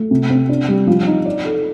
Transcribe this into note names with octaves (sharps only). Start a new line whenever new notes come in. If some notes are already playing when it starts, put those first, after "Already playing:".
Already playing: A3
C3
C4
D4
G3
F3
D#4
D5
A4